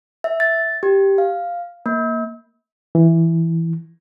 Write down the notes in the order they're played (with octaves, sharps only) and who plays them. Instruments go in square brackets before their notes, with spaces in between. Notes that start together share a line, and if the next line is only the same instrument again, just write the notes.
[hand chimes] E5
A6
G4
F5
A#3
[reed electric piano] E3